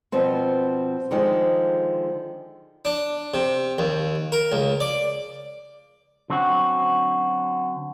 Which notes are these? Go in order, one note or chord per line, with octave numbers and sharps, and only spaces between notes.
B2 F3 G3 B3 C4
D3 D#3 F3 G#3
D4
C3
D#2
A#4
C#2
D5
D3 F#3 C4 C#4 F#4